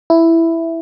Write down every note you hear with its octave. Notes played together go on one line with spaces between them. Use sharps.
E4